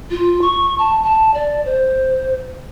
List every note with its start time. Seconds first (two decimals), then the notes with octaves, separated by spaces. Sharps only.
0.10 F4
0.41 C#6
0.78 A5
1.03 A5
1.34 D5
1.65 C5